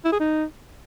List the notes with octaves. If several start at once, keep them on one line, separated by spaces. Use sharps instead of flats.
E4
G#4
D#4